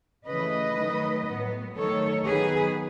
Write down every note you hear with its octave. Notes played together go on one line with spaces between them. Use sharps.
C#3 E3 A3 B4 D#5
D#3 F#3 A3
A2 F#3 B3
D#3 F#3 A3 A4 C#5
D#3 F#3 B3 G#4 B4